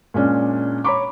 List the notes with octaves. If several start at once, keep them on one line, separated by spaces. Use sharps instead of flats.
A#2 G#3 C#4 D4
C#5 A#5 B5 C#6 D6